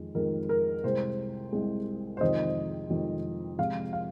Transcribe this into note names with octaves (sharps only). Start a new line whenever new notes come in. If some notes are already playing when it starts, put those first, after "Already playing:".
Already playing: F2 D#3 G#3
F2 D#3 G#3 A#4
A#4
C2 C3 G#3 C5
C2 C3 G#3
C5
F2 C3 D#3 G#3 D#5
F2 C3 D#3 G#3
F2 C3 F3 G#3 F5
F5